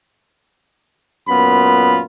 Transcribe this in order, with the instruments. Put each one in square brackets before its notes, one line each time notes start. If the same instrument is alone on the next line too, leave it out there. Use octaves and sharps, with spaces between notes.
[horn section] F#2 A#2 B3 F4 B5